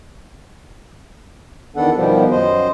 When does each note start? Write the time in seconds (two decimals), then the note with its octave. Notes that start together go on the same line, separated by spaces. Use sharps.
1.76 E2 D#3 B3 D4 A4 F#5
1.96 B2 D#3 F3 G3 B3
2.31 F#2 C5 D#5